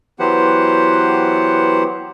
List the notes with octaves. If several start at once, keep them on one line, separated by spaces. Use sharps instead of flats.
E3 F#3 B3 G4 C5 F#5